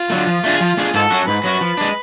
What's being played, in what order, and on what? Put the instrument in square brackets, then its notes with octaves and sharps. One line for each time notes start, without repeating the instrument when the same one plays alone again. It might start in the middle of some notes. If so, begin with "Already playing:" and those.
Already playing: [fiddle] F4
[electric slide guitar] D3 F#3 A3
F3
A3 D4 G#4
F3
A3 D4 G#4
[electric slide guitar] G#2 [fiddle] A4
[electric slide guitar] F#3 C#4 F#4
[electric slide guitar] G#2 [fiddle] B4
[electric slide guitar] F#3 C#4 F#4
F3
G#3 D4